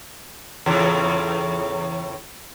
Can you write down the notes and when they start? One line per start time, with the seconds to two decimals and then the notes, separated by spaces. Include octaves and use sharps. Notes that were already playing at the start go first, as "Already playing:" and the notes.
0.66 E2 A2 C#3